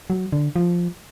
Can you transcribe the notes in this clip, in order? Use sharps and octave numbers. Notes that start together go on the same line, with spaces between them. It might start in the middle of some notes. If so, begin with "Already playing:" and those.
F#3
D3
F3